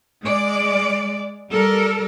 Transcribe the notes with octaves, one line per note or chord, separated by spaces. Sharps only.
G#3 D5
G3 A4 A#4